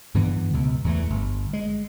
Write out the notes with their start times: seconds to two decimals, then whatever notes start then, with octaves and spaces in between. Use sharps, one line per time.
0.14 G2 D3 E3 B3
0.53 C#2 B2
0.84 E2 E3 A3
1.10 G1
1.53 G#3